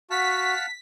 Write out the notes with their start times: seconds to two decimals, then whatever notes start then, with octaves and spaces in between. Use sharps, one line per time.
0.10 F#4 F5 F#5 A5 B6